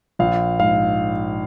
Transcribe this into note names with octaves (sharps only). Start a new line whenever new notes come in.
A#1 F5
G#2 F5